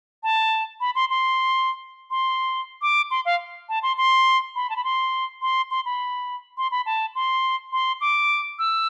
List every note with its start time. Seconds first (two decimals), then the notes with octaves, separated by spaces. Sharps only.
0.23 A5
0.80 B5
0.95 C6
1.10 C6
2.11 C6
2.82 D6
3.11 C6
3.25 F5
3.69 A5
3.83 C6
3.97 C6
4.56 B5
4.70 A5
4.76 B5
4.84 C6
5.42 C6
5.71 C6
5.85 B5
6.58 C6
6.71 B5
6.86 A5
7.15 C6
7.72 C6
8.01 D6
8.59 E6